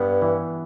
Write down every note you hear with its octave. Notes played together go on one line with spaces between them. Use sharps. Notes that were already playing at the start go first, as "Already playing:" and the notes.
Already playing: G2 B3
E3